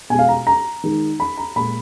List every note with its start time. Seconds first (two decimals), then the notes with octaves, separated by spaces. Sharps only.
0.10 B2 G#3 G#5
0.19 F5
0.29 A#5
0.47 A#5
0.84 D#3 G#3
1.20 B5
1.37 A#5
1.56 A#2 G#3 B5